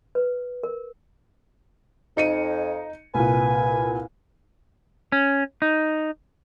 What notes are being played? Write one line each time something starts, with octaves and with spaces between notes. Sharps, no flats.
B4
A#4
F2 D#4 C#7 D#7
C2 A#2 B4 G#5
C#4
D#4